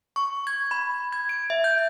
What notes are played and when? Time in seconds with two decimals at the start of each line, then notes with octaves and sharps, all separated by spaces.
0.16 C#6
0.47 G#6
0.71 B5
1.13 G#6
1.29 D7
1.50 E5
1.64 G6